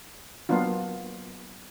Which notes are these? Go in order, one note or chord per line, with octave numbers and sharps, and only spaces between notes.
F#3 A#3 B3 D4 F4